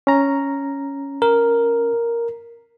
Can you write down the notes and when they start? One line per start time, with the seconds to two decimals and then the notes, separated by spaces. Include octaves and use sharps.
0.07 C#4 A#5
1.22 A#4